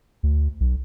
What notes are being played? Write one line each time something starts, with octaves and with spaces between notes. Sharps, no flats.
D2
B1